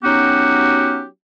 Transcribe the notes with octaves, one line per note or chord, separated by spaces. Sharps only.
F#3 B3 C#4 D#4 F#4 G4